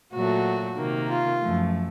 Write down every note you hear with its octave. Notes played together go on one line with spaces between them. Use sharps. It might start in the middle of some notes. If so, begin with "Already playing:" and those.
A#2 F#3 A3 F#4
C3 D#3 A#3
F4
F#2 F3 A3